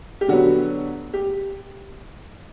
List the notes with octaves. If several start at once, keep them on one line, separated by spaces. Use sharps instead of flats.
G4
D3 F#3 B3 F#4
G4